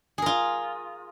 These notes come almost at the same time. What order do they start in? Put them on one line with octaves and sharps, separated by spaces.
G#4 A#4 F4